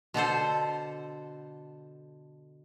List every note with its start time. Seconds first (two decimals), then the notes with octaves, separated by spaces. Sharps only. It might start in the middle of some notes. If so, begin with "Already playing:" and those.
0.14 B2 D3 A4 C5